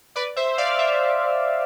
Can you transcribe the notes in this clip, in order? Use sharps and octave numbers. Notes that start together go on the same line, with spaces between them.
B4 D5
C5 E5
D5 F5
C5 E5